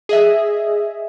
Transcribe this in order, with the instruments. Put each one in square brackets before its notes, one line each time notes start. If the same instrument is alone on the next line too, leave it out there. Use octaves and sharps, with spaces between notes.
[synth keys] G#4 D#5 E5